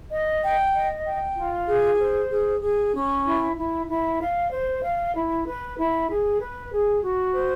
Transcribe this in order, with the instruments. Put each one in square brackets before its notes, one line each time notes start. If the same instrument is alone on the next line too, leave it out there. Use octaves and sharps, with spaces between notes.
[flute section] D#5
G5
D#5
G5
F4
G#4
C5
G#4
G#4
C#4
E4
E4
E4
F5
C5
F5
E4
B4
E4
G#4
B4
G#4
F#4
C5